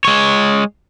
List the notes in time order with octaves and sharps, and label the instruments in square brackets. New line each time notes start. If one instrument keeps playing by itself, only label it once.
[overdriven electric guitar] G#3 C#5